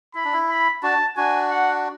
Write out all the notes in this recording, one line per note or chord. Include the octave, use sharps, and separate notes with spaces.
E4 B5
D4
E4
B5
D4 F#4 A5
D4 F#4 G#5
F#5